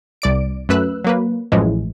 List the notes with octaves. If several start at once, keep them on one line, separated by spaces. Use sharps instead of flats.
C2 D5 D7
F#2 A3 B4 E6 F#6
F#3 A#3 B4
A1 F#2 A2 E3 F3 G#3